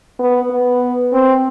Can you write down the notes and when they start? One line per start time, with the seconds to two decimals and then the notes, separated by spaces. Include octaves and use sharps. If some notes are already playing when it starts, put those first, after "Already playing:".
0.19 B3
0.50 B3
1.13 C4